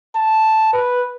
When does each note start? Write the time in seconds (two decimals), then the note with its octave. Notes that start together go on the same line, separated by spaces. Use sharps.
0.15 A5
0.73 B4